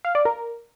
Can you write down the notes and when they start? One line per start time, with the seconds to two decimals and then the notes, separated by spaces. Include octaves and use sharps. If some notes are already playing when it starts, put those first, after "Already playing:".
0.05 F5
0.15 D5
0.25 A#4